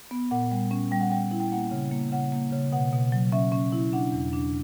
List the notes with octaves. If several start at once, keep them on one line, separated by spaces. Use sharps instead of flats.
B3
A#2 F#5
G3
C#4
G3 G5
F#5
G3 G5
E4
G5
A#3 F#5
C#3
A#3
C#3 F#5
A#3
C#3
B2 F#5
B2
F#3
C#4 E5
C#4
E4
D4 F#5
E2
D4